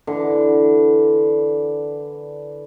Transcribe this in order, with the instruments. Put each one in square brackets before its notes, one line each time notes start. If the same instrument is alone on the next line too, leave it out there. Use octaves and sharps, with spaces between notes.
[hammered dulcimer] D3 E3